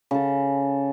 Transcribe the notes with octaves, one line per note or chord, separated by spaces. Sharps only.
C#3 A4